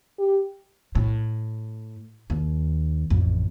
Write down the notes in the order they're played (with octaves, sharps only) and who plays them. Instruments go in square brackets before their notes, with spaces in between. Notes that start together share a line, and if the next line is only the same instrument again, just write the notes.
[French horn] G4
[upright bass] A2
D#2
A1 F2